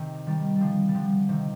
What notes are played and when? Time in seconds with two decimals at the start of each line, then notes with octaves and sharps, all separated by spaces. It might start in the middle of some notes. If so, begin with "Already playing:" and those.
Already playing: C3 D#3
0.27 D#3 G3
0.56 D3 F3 G3
0.89 G3
0.95 D3 F3
1.29 C3 D#3